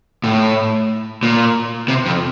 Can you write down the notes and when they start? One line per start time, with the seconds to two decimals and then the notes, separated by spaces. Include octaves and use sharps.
0.24 A2
1.23 A#2
1.88 C3
2.06 F2